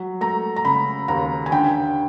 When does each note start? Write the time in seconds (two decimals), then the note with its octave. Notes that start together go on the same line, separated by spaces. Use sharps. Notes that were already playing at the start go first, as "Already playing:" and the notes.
Already playing: F#3
0.21 A3 A#5
0.56 A#5
0.65 C#3 B5
1.08 D#2 A#5
1.46 G#5
1.52 D3 G5